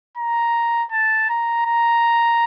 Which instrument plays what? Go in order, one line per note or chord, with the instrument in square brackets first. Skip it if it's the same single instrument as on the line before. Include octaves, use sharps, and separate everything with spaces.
[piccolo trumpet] A#5
A5
A#5
A#5